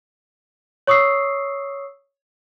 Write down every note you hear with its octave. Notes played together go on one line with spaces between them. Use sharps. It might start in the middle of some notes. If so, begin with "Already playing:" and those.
C#5 C#6 D#6 E6 C7